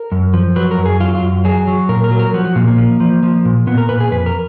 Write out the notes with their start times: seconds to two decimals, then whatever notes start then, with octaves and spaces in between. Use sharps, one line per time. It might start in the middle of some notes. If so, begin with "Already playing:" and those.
Already playing: A#4
0.12 F#2
0.34 F3
0.56 F#3 B4
0.71 A#4
0.78 F#2
0.86 G#4
1.00 F#3 F4
1.15 F4
1.23 F#2
1.45 F#3 G#4
1.67 F#3
1.89 A#2 A#4
2.04 A#4
2.11 F#3
2.19 A#4
2.34 F3 F#4
2.45 F#4
2.56 A#2 A#3
2.68 A#3
2.78 F3
3.00 F3
3.23 F3
3.45 A#2
3.67 A#2 B3
3.78 A#4
3.89 A#2 B4
4.00 G#4
4.11 F2 B4
4.26 A#4